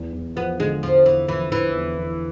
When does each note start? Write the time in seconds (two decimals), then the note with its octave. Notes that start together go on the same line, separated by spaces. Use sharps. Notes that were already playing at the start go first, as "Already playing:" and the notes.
Already playing: E2
0.13 E2
0.36 F3 B3
0.59 D3 G#3
0.82 E2 F3
1.05 E2 E3
1.28 E3 F3
1.52 D3 E3
1.75 E2
1.98 E2